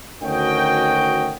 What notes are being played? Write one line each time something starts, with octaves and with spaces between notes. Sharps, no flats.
D2 D#3 C#4 F#4 D#5 G5